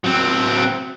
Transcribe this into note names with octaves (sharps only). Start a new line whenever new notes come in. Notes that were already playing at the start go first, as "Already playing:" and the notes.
F#3 C4